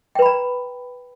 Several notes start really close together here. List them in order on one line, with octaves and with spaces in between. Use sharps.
G5 B4 B5 A#5